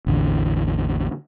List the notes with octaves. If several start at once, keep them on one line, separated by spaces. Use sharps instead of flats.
A1 E2 D3